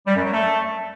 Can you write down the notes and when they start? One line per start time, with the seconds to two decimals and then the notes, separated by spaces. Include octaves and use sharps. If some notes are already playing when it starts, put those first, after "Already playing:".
0.06 G3
0.15 F#2
0.24 F#3
0.33 A3